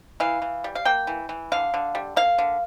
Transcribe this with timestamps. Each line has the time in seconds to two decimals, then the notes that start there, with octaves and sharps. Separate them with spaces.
0.20 E3 F5
0.42 E3
0.64 G3
0.75 F5
0.85 A#3 G5
1.07 E3
1.29 E3
1.52 D3 F5
1.74 D3
1.95 G3
2.16 A#3 F5
2.38 D3